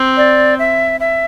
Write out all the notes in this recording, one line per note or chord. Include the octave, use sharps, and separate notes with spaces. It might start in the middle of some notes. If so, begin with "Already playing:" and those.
Already playing: C4
D5
E5
E5